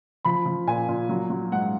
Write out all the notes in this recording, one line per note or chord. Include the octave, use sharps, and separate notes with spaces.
F3 B5
F3
A#2 G#5
A#2
F#3
F#3
G#2 F#5